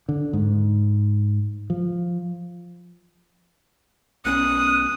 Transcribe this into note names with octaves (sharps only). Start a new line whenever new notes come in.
D3
G#2
F3
B1 B3 C#4 D#6 F#6